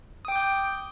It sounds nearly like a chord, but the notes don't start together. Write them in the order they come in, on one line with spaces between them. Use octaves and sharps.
D#6 G5 D6 G6